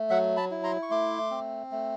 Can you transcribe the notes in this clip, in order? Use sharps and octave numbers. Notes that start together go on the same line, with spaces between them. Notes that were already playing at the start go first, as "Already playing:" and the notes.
Already playing: A3
F#3 E5 F#5
A5 B5
E4
A#5 C6
C#6
A3 C6 D6
C4
A3